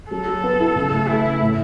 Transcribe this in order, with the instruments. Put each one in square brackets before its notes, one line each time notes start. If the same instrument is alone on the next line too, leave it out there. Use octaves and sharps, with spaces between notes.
[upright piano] F#3 [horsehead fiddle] A4
[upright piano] F#3
B3
E4
C#3
A3
[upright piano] A3 [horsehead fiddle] E4
[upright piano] C#3
A2